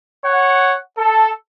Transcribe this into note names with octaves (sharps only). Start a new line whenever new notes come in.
C#5 F#5
A4